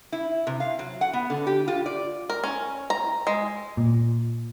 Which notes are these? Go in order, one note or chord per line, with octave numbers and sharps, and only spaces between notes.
E4
C3
F5
F#3
F#5
B3
D3
G4
F4
D5
A#4
C#4
A#5
G#3
A#2